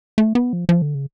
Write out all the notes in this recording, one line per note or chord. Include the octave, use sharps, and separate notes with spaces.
A3
B3
F3
F3
D3
C#3